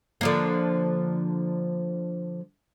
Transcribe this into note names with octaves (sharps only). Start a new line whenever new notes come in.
D3 F3 A#3